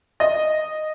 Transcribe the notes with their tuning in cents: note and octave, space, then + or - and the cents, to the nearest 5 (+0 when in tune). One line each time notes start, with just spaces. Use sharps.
D#5 -10